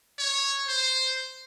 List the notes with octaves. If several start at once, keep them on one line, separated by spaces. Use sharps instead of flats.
C#5
C5